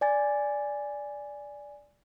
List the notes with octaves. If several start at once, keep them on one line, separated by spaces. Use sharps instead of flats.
D5 G#5 A6